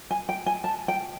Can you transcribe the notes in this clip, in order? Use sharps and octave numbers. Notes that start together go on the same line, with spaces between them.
G#5
G5
G#5
A5
G5